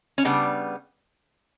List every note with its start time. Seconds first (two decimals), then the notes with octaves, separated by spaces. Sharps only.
0.18 C#4
0.25 C#3 G3 B3 D4